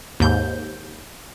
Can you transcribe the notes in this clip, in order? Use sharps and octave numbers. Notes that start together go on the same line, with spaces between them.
D#2 G#2 G6